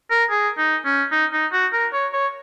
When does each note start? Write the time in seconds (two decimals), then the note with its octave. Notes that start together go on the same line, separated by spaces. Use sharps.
0.10 A#4
0.31 G#4
0.58 D#4
0.85 C#4
1.12 D#4
1.33 D#4
1.52 F#4
1.73 A#4
1.93 C#5
2.13 C#5